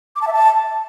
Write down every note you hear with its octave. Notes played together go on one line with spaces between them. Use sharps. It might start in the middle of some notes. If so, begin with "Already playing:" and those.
D6
A5
E5
A5